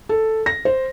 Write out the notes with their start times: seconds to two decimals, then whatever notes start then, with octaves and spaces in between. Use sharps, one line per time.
0.09 A4
0.46 A#6
0.65 C5